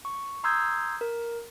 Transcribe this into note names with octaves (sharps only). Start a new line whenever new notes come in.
C#6
A#5 C6 D#6 E6 G6 G#6
A#4